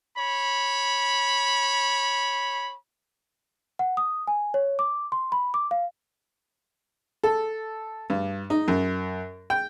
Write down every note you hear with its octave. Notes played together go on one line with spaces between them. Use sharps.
C#5 B5
F#5
D#6
G#5
C#5
D6
C6
B5
D6
F5
A4
G2
D#4
F#2
G5